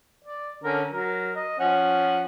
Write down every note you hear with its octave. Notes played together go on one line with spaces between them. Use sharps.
D5
D3 C#4 A#4
F#3 A#4
D#5
F3 C#4 F#5